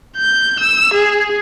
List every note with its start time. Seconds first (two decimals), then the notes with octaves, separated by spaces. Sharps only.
0.17 G6
0.60 E6
0.93 G#4